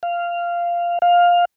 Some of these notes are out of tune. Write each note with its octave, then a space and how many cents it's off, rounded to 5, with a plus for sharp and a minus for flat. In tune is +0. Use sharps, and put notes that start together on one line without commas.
F5 -10
F5 +10